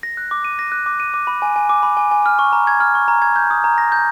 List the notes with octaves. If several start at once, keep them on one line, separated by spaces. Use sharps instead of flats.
A#6
F#6
D6
D#7
A#6
F#6
D6
D#7
D6
B5
G#5
G#5
D6
B5
G#5
G#5
F6
C#6
A#5
G#6
F6
C#6
A#5
G#6
G6
D#6
A#5
A#6
G6